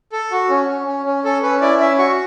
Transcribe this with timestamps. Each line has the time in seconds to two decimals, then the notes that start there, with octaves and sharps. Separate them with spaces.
0.12 A4
0.31 F#4
0.49 C#4
0.68 C#4
0.87 C#4
1.06 C#4
1.24 C#4 A4
1.42 C#4 B4
1.61 E4 D5
1.80 C#4 E5
1.98 F#4 C#6